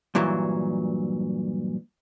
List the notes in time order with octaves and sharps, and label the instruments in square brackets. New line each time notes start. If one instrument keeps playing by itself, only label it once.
[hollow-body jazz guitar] G2 A#2 E3 F#3